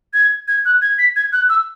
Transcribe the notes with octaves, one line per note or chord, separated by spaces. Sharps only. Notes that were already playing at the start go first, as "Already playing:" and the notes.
G#6
G#6
F#6
G#6
B6
G#6
F#6
E6